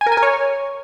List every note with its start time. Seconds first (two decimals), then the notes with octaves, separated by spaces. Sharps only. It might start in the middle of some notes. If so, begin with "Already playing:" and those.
0.01 G#5
0.06 A#4
0.12 G#5
0.17 A#4
0.23 C#5